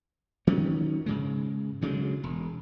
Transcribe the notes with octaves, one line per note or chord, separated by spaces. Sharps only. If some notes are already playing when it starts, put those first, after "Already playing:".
D#3 F#3 C#4
G#2 C#3 G#3
D2 C#3 F#3 G#3
E1